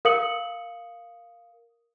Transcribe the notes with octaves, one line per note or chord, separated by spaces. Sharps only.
A#4 F5 D#6 C#7 F#7